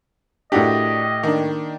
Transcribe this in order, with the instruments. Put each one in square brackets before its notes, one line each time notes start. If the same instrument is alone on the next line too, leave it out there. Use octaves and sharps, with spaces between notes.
[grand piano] A2 G4 [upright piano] D4 F#4 A#4 [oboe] D#5
[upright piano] D#3 A#3 D4